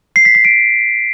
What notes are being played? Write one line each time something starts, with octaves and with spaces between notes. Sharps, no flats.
C7
B6
C7
D7